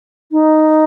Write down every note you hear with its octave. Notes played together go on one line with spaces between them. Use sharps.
D#4